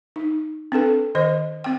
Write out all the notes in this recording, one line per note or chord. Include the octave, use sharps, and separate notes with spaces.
D#4
C4 D4 A4 B4
D#3 C5 D#5
C4 G5